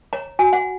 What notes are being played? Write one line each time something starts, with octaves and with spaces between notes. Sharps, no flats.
C#5 A#5
F#4 G#5
F#5